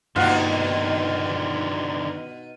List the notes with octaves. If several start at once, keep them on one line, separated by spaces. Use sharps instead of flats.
G2 B2 D3 D#3 A#3 D#4 F4 F#5